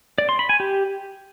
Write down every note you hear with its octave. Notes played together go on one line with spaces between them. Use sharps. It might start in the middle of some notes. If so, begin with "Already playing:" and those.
D5
C6
B5
G#5
G4